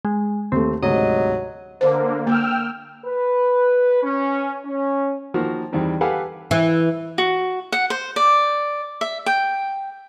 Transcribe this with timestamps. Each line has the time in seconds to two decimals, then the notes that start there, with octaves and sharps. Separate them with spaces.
0.05 G#3
0.52 D#2 A3 C4
0.83 D2 G#2 C3 F#3 D#5
1.81 D3 A#3 C5
2.27 A#3 G5 E6 F6
3.06 B4
4.02 C#4
4.66 C#4
5.34 D#3 F3 A#3 F#4 A#4
5.73 E2 D#3 G3 C4
6.01 G4 A4 B4 F5 F#5 G#5
6.51 E3
7.18 F#4
7.72 F#5
7.90 C5
8.16 D5
9.01 E5
9.26 G5